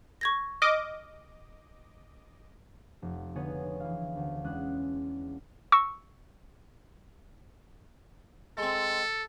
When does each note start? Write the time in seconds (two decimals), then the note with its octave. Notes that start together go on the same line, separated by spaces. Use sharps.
0.21 C#6 G#6 A#6
0.62 D#5 D6 F6
3.02 F1
3.35 D3 B3 D#4 G#4 C#5
3.80 E3 F5
4.16 D2
4.44 E2 G#3 C#4 D4 F#6
5.72 C#6 E6 A#6
8.58 G#3 C4 A4